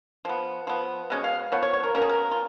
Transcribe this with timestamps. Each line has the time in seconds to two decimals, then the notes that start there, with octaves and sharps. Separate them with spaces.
0.25 F3 B3
0.67 F3 B3
1.10 B2 G#3 C#4
1.24 F5
1.52 F3 B3 C#5
1.63 C#5
1.73 C#5
1.83 A#4
1.95 B2 A#3 C#4 A#4
2.02 G#4
2.09 A#4
2.31 F4